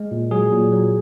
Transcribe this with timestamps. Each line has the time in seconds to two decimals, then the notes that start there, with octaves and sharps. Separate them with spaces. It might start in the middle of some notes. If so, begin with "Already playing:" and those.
Already playing: G#3
0.11 A#2
0.31 F#3 G#4
0.52 A#2
0.72 F#3